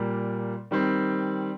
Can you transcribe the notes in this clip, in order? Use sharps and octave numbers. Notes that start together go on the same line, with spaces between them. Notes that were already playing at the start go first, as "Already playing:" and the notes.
Already playing: A#2 G3 A#3
D#3 G3 C4